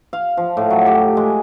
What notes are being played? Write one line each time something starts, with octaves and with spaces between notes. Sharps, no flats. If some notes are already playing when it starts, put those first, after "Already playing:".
F5
F3
A2
F#3
G4
G#3